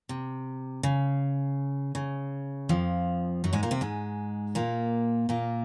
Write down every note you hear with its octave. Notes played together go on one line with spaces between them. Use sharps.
C3
C#3
C#3
F2 F3
F#2 F#3
G#2 G#3
A#2 A#3
C3 C4
G#2 G#3
A#2 A#3
A#2 A#3